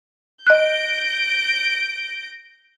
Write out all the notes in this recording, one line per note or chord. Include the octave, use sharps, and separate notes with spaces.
D#5 F#6 G6 A#6 D7